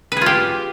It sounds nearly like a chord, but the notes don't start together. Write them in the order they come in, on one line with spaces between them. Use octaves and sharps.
B4 G#4 F4 G4